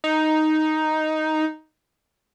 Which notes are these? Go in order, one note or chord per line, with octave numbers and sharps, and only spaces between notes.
D#4